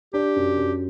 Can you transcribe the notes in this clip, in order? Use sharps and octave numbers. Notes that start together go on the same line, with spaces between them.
D4 G4
F#2
F#2